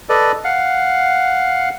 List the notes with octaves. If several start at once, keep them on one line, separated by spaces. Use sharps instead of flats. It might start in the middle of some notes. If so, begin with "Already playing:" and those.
A4 B4 D5 D#5
F5 F#5